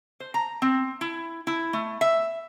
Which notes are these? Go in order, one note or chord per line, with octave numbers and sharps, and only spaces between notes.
C5
A#5
C4
E4
E4
A3
E5